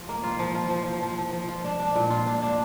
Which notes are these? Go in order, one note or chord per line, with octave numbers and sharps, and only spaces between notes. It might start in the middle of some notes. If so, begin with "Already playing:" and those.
Already playing: F3
A#3
F4
F3
F4
F3
F3
F3
F3
F3
F4
D4
D4
A#2
F4
D4
D4